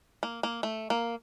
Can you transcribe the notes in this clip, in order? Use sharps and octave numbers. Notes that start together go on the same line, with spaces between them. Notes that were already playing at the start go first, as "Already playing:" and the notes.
A#3
A#3
A3
A#3